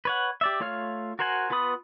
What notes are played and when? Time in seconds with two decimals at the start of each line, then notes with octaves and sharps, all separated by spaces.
0.05 B4 C#5 F#5
0.41 G4 D5 E5
0.60 A3 F4 C#5 F5 F6
1.19 F#4 A#4 C5 F#5 G#5
1.50 B3 F4 B4 B5 D#6